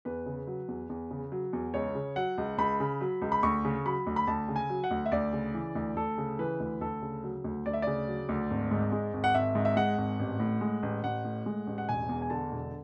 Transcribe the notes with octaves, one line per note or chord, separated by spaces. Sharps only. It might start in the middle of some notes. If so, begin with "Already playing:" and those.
E2 B4
C#3
F#3
E2
E2
C#3
F#3
E2
C#2 C#5
C#3
F#3 F#5
C#2
C#2 B5
C#3
F#3
C#2
B5
D2 C#6
C#3
F#3 B5
D2
B5
D2 A5
C#3
G#5
F#3
F#5
D2
E5
D2 D5
C#3
E3
D2
D2 A4
C#3
E3 B4
D2
D2 A4
C#3
F#3
D2
D2 D5
E5
C#3 D5
F#3
D2
G#1
G#2
G#3
G#1
F#5
G#1 E5
G#2
E5
G#3 F#5
G#1
A1
A2
G#3
A1
A1 F#5
A2
G#3
A1
F#5
E1 G#5
E2
G#5
D3 A5
E1